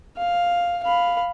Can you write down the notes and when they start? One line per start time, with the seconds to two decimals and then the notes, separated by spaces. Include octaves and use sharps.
0.17 F5
0.84 F5 B5